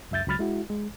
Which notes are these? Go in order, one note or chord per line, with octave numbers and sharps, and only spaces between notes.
C#2 F#2 E5 G6 A6
C#2 F#3 B5 F6 A6
G#3 E4 F#4
G#3